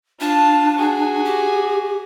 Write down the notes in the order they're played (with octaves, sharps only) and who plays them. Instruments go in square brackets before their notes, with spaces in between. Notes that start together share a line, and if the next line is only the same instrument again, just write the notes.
[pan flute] D4 [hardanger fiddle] F4 A5
[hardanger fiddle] F#4 G#4
[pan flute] G4